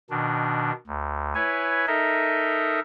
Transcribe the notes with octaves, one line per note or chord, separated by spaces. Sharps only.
B2 D#3 D4
D2
E4 B4 C#5 G#5
D#4 A4 A#4 D#5 E5